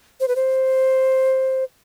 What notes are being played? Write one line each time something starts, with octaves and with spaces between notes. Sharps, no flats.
C5
B4
C5